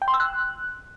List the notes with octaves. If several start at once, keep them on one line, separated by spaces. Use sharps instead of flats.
G5
C6
E6
F#6